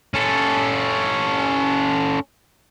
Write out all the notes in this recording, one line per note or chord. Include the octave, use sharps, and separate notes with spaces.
C#4 A4